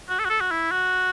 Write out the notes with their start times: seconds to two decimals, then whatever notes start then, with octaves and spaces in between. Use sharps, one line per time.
0.09 F#4
0.19 A4
0.25 F#4
0.29 A4
0.40 F#4
0.51 E4
0.72 F#4